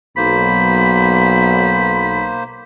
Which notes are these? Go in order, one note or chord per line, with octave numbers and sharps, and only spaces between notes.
B1 A#3 C5 B5